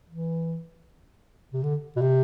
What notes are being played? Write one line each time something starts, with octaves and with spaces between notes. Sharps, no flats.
E3
C3
D3
B2
C3